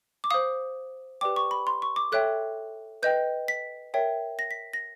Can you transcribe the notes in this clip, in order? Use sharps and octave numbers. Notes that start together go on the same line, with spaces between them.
D6
C5 F5 D#6
G4 B4 D5 G5 D6
C#6
B5
C6
C#6
D6
A4 C#5 E5 G5 F#6
B4 D#5 G5 G6
B6
A#4 C#5 E5 G5
A#6
B6
A#6